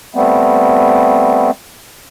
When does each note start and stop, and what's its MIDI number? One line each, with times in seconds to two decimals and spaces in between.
0.15 1.51 55
0.15 1.51 57
0.15 1.51 59
0.15 1.51 60